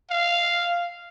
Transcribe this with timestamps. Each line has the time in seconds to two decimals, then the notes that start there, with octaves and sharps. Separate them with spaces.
0.11 F5